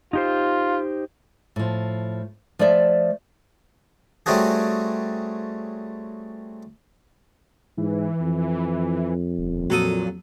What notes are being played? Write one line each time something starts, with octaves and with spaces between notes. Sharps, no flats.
D#4 F4 G4 C5
A2 F3
F3 A3 C5 D5 E5
G3 A3 C4 C#4 F#4 G#4
G#2 E3
F2
D#1
A#2 F#3 A4 D#6